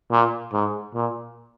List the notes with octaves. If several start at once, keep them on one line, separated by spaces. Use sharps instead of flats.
A#2
G#2
A#2